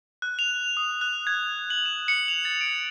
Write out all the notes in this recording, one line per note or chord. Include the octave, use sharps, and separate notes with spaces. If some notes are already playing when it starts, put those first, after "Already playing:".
F#6
F7
D#6
F#6
G#6
F#7
E7
C#7
F7
A6
D7